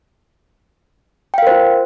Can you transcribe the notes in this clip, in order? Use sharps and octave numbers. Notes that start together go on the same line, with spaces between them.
F4 A#4 C5 F5 G5